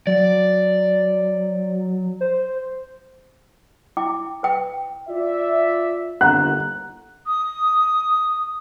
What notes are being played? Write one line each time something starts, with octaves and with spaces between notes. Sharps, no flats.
F#3 D5
C5
E4 G5 D6
B4 G5
F4 D5 E5
G1 D#2 F#5 A#5 F#6
D#6